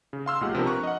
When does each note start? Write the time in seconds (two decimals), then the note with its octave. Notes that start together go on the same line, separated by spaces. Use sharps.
0.13 C#3
0.26 F5 C6 E6 F6
0.41 B1 A#2 G#3 G4 F#5
0.55 C3 F3 B3 D4 A#4
0.66 A#5 C#6 F6 F#6
0.83 D#5 F#5